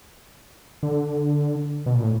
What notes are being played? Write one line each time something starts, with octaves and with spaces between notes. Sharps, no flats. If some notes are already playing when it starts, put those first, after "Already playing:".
D3
B2
A#2
A2